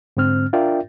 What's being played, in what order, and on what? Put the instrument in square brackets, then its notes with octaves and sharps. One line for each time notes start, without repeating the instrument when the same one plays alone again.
[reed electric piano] G#2 D3 C4 F6
D4 F4 A#4 D5 E5 G5